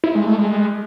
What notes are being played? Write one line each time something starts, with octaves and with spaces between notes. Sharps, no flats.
E4
G#3
A3
G#3